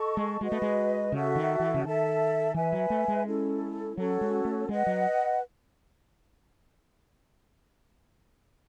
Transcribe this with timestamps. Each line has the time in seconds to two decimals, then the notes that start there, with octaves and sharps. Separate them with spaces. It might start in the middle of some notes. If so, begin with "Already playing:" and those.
Already playing: A4 D#5 A5 C#6
0.17 G#3
0.41 G#3 F#4 B4 D#5
0.52 A3
0.62 G#3
1.12 C#3 F#4 A4 E5
1.35 D#3
1.60 E3
1.74 C#3
1.84 D#3 A4 E5 A5
2.54 E3 B4 E5 G#5
2.72 F#3
2.90 A3
3.08 G#3
3.26 C#4 E4 A4
3.97 F#3 C#4 F#4 A4 C#5
4.21 G#3
4.45 A3
4.68 G#3 B4 D#5 F#5
4.87 F#3